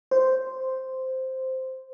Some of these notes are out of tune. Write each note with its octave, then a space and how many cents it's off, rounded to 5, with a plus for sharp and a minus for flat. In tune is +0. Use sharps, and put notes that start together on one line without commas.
C5 -5